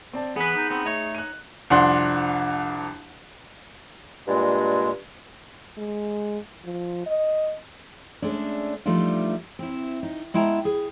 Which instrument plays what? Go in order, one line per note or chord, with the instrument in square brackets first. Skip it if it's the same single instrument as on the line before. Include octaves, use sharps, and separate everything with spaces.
[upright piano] C4 D5 A5
[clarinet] E3 [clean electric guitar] B3 B4 [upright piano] G#4
[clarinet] D#4
[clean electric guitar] B3 C4
[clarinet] A3 [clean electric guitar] D#4 C#5
[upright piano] F#6 D#7
[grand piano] C2 F2 D4 F#5 C6
[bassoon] G2 [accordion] A#2 G#3
[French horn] G#3
F3
D#5
[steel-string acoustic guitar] G#3 A3 C#4 D4
F3 G3 A3 D4 D#4 F4
C4 E4
D#4
G#3 B3 E4 G5 A5 A#5
G#4